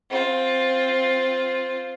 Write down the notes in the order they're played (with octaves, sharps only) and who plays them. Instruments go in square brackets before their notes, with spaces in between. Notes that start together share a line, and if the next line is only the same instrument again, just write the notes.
[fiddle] C4 F4